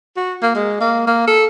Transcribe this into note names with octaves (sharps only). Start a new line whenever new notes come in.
F#4
A#3
G#3
A#3
A#3
A4